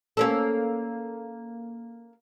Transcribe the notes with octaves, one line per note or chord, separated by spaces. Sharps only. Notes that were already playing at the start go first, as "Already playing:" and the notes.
A#3 C#4 A4